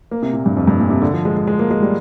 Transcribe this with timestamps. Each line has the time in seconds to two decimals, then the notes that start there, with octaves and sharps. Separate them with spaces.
0.11 A#3
0.23 C3
0.33 A#2
0.46 G2
0.57 F2
0.68 G2
0.79 A#2
0.90 C3
1.02 D3
1.14 F3
1.25 G#3
1.36 G#3
1.47 G#3
1.59 A#3
1.71 G#3
1.82 G3